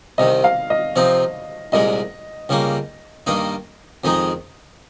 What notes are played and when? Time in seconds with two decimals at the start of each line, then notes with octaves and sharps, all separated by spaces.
0.18 C2 C3 D#3 D#5
0.44 F5
0.70 D#5
0.96 C3 F3 C4 D#4
1.72 C2 A#2 G#3 D#5
2.49 C#2 C#3 G3 A#3
3.26 G2 D#3 A#3 D#4
4.04 F2 D#3 G#3 D#4